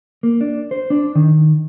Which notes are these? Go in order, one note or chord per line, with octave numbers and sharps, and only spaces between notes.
A#3
D4
C5
D4
D#3